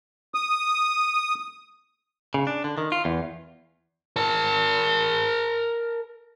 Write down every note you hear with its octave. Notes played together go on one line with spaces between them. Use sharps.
D#6
C#3
D4
D3
D#3
F4
E2
A#4 A5